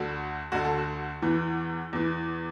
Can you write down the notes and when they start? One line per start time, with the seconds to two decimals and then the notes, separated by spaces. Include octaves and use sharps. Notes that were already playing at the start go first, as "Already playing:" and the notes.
Already playing: D2 D3 F#4
0.52 D2 D3 F#4
0.65 A4
0.78 F#4
1.22 E2 E3
1.93 E2 E3